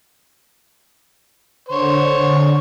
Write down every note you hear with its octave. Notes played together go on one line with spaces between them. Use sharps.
D3 C5 C#5